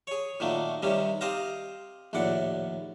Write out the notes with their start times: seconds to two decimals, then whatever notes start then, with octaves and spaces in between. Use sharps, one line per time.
0.07 G#4 C#5
0.40 A#2 D#3 F#3 A3 A#3
0.82 G2 C3 D#3 G3 C#4
1.21 C4 G4 C5 D#5 F5 A#5
2.13 A#1 D#2 A2 D5 F#5